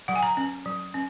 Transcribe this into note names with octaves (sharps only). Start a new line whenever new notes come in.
F#3 F#5
G#5
A#5
C#4
F#3
C#4